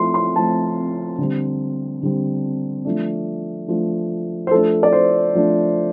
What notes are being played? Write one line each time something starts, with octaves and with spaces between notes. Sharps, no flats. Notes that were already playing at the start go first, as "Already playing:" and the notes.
Already playing: F3 A3 C4 C6
C6
F3 A3 C4 A5
D3 G3 C4
D3 G3 C4
F3 A3 D4
F3 A3 D4
C5
F3 A3 D4 A4
D5
C5
F3 A3 D4